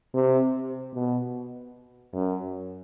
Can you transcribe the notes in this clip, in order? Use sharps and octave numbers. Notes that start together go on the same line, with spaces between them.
C3
B2
F#2